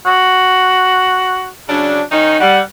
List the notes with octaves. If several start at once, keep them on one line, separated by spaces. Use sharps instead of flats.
F#4
C#3 F#3 D4
D#3 C#4 D#4
G3 F#5